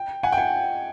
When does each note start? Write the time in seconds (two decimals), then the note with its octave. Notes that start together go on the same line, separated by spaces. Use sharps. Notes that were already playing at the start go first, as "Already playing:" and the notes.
Already playing: G5
0.23 F#5 G#5
0.32 G5
0.38 F#5 G#5